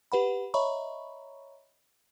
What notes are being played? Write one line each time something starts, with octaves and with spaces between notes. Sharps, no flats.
G4 B4 F#5 B5
C#5 D#5 E5 A#5 B5 C#6